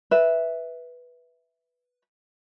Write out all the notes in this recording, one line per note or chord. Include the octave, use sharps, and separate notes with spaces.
B4 E5